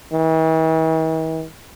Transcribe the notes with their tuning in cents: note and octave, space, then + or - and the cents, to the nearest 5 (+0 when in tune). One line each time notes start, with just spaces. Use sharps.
E3 -45